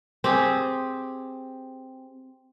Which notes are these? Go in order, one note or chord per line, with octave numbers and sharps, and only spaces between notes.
C4 G4 G#4